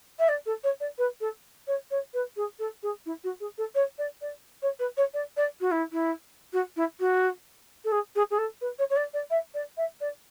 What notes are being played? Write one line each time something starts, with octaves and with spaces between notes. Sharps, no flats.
E5
D5
A4
C#5
D5
B4
A4
C#5
C#5
B4
G#4
A4
G#4
E4
F#4
G#4
A4
C#5
D5
D5
C#5
B4
C#5
D5
D5
F#4
E4
E4
F#4
E4
F#4
A4
G#4
G#4
G#4
A4
B4
C#5
C#5
D5
D5
E5
D5
E5
D5